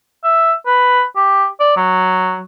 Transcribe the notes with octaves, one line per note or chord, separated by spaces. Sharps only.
E5
B4
G4
D5
F#3